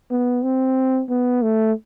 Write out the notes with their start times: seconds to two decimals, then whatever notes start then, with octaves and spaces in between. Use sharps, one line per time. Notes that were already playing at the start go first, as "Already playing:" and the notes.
0.11 B3
0.44 C4
1.10 B3
1.43 A3